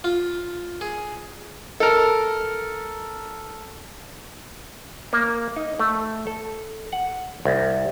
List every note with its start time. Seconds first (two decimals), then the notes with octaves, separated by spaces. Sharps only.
0.04 F4
0.81 G#4
1.80 A4 A#4
5.13 A#3
5.56 D#4
5.79 A3
6.27 A4
6.92 F#5
7.45 C2